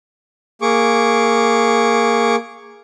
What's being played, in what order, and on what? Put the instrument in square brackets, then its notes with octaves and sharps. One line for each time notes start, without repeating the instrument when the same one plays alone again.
[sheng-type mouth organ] A#3 G#4 C#6 D6